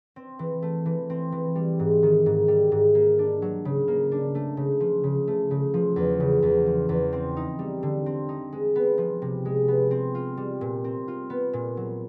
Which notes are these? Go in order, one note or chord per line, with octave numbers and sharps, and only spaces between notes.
C4
E3
A3
E3
C4
E3
G3
G#2
D#3
G#2
G3
G#2
A#3
D4
F#3
C#3
A#3
D4
A3
C#3
F3
C#3
A3
C#3
F3
E2
C#3
E2
F3
E2
C4
D#4
G3
D3
C4
D#4
G#3
B3
F3
C3
G#3
B3
C4
F4
G3
A#2
C4
F4
B3
A#2
F#3